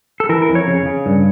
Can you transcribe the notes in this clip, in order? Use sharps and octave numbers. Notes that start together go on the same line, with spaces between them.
A4
E3 A#4
A#4
F2
C#5
C#3
C#3
G2